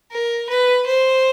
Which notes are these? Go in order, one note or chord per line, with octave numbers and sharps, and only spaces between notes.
A#4
B4
C5